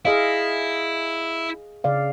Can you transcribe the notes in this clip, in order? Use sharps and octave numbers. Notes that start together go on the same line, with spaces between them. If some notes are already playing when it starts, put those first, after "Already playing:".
E4 G#4 D#5 F5
C#3 D5 F5